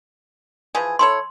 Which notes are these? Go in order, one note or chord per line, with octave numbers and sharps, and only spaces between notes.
E3 F3 G#4
E4 A4 C#5 C6